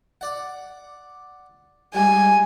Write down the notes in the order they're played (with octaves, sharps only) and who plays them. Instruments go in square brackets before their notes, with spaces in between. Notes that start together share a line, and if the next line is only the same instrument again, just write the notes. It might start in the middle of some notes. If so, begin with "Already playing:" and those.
[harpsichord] D5 F#5
[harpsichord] G#2 G3 [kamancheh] G#5